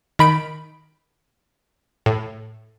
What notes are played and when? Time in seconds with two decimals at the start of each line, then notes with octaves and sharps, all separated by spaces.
0.19 D#3 B5 D7
2.06 A2